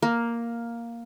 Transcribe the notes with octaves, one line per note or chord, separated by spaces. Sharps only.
A#3